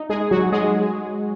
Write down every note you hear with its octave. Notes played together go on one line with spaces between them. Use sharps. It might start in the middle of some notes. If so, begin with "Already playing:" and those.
Already playing: D#4
G#3 G#4
F#3 F#4
G#3 G#4